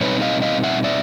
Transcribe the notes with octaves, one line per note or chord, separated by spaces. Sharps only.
B2 G3 C4 D#4 B4 C#5
D#5 F5
D#5 F5
E5 F#5
D5 E5